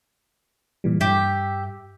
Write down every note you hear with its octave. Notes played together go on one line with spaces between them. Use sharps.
A#2 E3 G3
G2 G4 E5